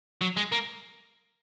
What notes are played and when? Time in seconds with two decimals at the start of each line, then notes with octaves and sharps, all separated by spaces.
0.21 F#3
0.37 G#3
0.52 A#3